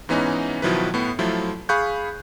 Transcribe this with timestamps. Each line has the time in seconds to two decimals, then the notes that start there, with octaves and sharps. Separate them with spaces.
0.09 G#2 E3 B3 C#4 D#4
0.62 B2 D#3 F3 F#3 E4 B4
0.94 A2 B3
1.19 F3 F#3 A3 E4 F4
1.69 G#4 F5 B5 C#6 F#6 G6